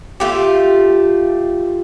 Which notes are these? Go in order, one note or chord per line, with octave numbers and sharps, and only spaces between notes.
A3 F4 G4